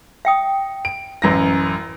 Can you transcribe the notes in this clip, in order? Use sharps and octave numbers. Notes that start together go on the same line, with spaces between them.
E5 G5 D#6
D7
A1 F#2 A#6